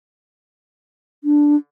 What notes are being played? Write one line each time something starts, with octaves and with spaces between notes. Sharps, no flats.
D4